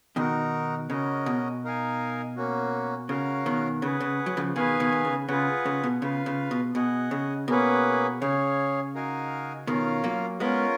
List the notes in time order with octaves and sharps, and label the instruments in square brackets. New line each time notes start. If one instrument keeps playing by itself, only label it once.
[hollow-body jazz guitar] B2 D#3 [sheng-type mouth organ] D#4 F#4 A#4
[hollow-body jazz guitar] C#3 [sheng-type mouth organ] C#4 F#4 A#4 D#5
[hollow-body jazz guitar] B2
[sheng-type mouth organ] D#4 A#4 F5 G#5
A#3 C#4 F#4
[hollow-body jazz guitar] C#3 [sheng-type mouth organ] C#4 F#4 A#4 F5
[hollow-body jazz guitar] B2 D#3
[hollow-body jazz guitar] C#3 [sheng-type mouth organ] G#4 B4 F#5
[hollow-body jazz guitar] C#3
F#3
C#3 F3
[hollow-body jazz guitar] B2 D#3 [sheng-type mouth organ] G#4 B4 F5 G#5
[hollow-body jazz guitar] B2 D#3
B2
C#3
[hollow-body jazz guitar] C#3 [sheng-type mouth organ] F4 G#4 B4 F#5
[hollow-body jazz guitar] C#3
B2
[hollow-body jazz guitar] C#3 [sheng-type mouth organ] F4 B4 F5
[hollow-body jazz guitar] C#3
B2
[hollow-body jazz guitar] B2 [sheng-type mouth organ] G#4 D#5 F#5
[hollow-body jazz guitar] C#3
[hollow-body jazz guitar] B2 [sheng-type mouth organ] A#3 C#4 G#4 B4 F#5
[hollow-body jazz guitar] C#3 [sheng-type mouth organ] G#4 C#5 F5
[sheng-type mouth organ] D#4 F#4 A#4 F5 G#5
[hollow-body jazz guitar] B2 D#3 [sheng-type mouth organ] C#4 F4 A#4 F5
[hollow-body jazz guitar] F#3 A#3
[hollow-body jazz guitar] G#3 B3 [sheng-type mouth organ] C#4 F4 A#4